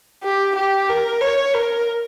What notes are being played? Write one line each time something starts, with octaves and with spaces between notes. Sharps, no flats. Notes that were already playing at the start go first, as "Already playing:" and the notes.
G4
G4
A#4
C#5
A#4